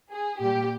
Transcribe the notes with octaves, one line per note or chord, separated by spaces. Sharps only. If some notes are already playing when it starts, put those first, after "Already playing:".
G#4
A#2 G3 G4